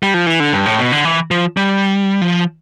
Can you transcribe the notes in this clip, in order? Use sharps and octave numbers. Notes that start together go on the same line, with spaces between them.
G3
F3
E3
D3
G2
A2
B2
D3
E3
F3
G3
F3